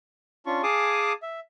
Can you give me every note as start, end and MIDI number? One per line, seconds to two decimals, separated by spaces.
0.46 0.62 61
0.46 0.62 62
0.46 0.62 65
0.46 0.62 85
0.63 1.13 68
0.63 1.13 77
0.63 1.13 80
0.63 1.13 81
0.63 1.13 86
0.63 1.13 87
1.22 1.40 76